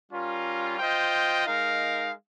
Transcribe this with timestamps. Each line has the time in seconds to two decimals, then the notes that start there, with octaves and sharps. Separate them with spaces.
0.11 G3 C#4 F4 A#4
0.79 F4 C5 D#5 G5
1.46 G#3 D#4 A#4 F5